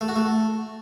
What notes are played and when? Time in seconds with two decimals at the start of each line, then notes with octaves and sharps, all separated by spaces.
0.01 A3
0.08 F#4
0.16 A3